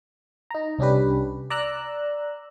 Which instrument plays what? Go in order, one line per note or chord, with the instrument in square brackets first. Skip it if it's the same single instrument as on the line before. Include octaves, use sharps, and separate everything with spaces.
[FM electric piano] D#4 A#5
C2 C#4 D4 G4 B4
D5 A#5 E6 F#6